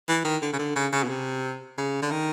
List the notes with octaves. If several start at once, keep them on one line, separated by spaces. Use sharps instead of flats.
E3
D#3
D3
C#3
D3
C#3
C#3
B2
C3
C#3
D3
D#3